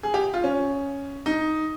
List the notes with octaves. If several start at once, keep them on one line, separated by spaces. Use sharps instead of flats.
G#4
G4
F4
C#4
D#4